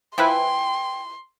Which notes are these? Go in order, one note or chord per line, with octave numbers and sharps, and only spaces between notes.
F3 E4 B4 G5 G#5 C6